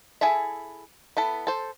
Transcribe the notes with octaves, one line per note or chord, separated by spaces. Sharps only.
E4 G#4 A4 E5
B3 E4 A4
A4 C5